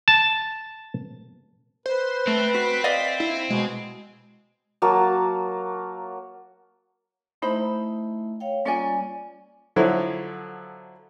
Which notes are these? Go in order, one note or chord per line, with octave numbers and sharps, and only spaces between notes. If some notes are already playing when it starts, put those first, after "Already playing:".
A5
B4 C5
A3 C4
F#4 B6
D5 D#5 F5
E4
B2 G#3
F#3 A#3 A5
A3 D#4 E4 C5 E5 B5
C#5 F5 G5
G3 A#3 C#4 F4 D5 G#5
D3 F3 F#3 E4